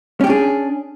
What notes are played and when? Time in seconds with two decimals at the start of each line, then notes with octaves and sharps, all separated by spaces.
0.21 C#4
0.24 G4
0.27 D4
0.30 G#4